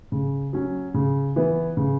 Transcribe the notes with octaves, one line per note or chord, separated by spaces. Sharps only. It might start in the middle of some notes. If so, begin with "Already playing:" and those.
C#3
F#3 C#4
C#3
E3 B3
C#3